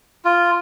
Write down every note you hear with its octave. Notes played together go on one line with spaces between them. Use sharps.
F4